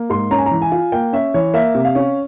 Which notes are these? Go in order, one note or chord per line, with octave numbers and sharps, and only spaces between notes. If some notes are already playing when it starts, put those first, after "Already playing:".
Already playing: A#3
G#2 C6
C#4 A#5
G#5
A#5
E3
G#5
F4
A#3 G5
C#4 E5
E3 C#5
A#3 E5
C3
F5
C#4